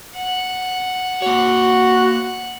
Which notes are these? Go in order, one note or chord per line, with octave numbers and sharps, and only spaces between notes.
F#5
A#3 F#4 C#5